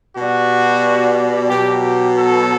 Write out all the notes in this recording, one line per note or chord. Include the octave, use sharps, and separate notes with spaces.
B2 G3 F#4
B2 F#3 G4
G4
A4